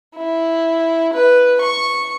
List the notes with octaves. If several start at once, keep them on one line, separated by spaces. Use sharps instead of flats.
E4
B4
C#6